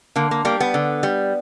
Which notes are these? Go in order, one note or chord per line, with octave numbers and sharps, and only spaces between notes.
D3 A#3
A#3
G3 A#3
B3
D3
G3